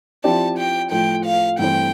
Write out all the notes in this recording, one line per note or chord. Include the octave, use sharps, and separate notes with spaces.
F3 C4 E4 G4 D5 A5
G5
A2 F3 A3 G5
F5
G2 E3 A3 C4 G5